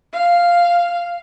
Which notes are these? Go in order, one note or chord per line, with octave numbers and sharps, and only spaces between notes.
F5